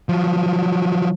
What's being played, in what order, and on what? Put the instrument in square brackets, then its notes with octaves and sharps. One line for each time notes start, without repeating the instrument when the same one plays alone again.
[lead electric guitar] F3 F#3